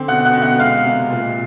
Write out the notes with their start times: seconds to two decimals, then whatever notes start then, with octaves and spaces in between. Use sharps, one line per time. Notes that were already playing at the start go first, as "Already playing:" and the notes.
Already playing: D3 C4
0.08 B2 F#5 F#6
0.25 F#5 F#6
0.33 B2
0.42 F#5 F#6
0.59 G#3 F5 F6
0.85 C3
1.10 A#2